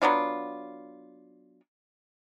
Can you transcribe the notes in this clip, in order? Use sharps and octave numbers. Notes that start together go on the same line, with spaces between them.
F#3 B3 D4 F4